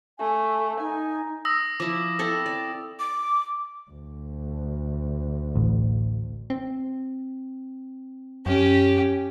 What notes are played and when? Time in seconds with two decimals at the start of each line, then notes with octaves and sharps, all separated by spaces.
0.19 A3 G#5
0.80 D#4 G#5
1.45 D#6 E6 A#6
1.80 F3 E4 D6
2.19 C4 E4 A4
2.46 D5
2.99 D6
3.91 D2
5.55 A1
6.50 C4
8.46 F#2 C#4 G4